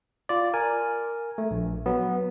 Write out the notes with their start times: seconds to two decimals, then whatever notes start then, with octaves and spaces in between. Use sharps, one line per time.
0.29 F4 D5
0.54 A#4 G#5
1.38 A3
1.51 A#1
1.86 F#3 B3